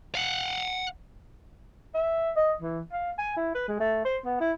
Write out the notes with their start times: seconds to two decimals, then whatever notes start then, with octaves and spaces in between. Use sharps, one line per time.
0.15 F5 F#5
1.95 E5
2.36 D#5
2.62 E3
2.92 F5
3.19 G#5
3.37 E4
3.55 B4
3.68 G#3
3.80 A3
4.05 C5
4.25 B3
4.40 E4